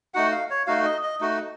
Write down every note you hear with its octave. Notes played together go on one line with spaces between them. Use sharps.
A3 D#4 F#4 F#5
F5
C#5
A3 D#4 F#4 F5
D#5
D#5
A3 D#4 F#4